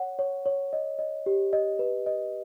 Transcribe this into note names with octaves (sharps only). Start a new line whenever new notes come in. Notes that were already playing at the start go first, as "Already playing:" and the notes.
Already playing: C#5 F#5
C#5
C#5
D#5
D#5
G4
D#5
B4
D#5